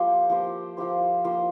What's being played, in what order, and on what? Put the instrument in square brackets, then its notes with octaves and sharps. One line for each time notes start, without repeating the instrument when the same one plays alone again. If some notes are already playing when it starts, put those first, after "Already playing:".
Already playing: [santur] F3 A#3 G4 C5
F3 A#3 G4 C5
F3 A#3 G4 C5
F3 A#3 G4 C5